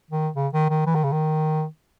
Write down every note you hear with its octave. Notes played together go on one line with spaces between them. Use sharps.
D#3
C#3
D#3
D#3
E3
D#3
C#3
D#3